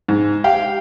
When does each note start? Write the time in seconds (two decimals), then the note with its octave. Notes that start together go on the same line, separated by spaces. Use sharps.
0.08 G#2
0.44 G4 F5 G5